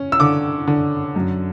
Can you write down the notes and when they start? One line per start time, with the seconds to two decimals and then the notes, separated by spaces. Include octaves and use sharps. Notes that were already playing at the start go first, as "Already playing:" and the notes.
Already playing: C#4
0.12 E6
0.20 D3 D6
0.67 D3
1.16 F#2